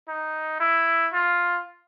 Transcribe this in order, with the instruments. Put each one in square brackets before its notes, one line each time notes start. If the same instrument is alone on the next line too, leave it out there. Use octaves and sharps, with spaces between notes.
[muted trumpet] D#4
E4
F4